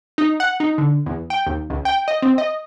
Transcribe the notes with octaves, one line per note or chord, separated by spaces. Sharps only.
D#4
F#5
D#4
D3
E2
G5
D#2
C#2
G5
D#5
C4
D#5